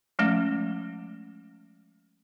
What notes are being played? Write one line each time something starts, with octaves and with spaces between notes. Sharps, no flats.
F3 G#3 A3 C#4